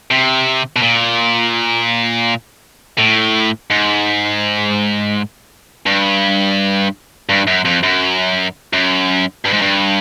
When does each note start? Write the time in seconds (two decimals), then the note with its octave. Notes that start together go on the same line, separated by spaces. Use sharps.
0.11 C3
0.76 B2
0.82 A#2
2.98 A2
3.70 G#2
5.86 G2
7.29 G2
7.47 F#2
7.65 F2
7.83 F#2
8.73 F#2
9.45 G2
9.53 G#2
9.62 G2